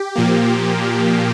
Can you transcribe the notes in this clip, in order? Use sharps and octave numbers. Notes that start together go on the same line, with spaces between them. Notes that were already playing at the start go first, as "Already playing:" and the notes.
Already playing: G4
A#2 F3 A#3